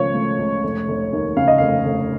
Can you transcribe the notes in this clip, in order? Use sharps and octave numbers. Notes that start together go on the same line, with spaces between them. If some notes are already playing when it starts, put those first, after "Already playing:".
Already playing: C#2 C#3 F3 A3 C#5
A3
C#2
F1
F1
D#2
C#3 F5
D#5
F1 F5
F1